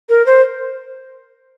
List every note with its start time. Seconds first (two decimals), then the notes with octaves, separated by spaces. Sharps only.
0.09 A#4
0.26 C5